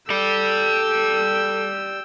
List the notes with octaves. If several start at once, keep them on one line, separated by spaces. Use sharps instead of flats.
G4 A4 D5 G5 E6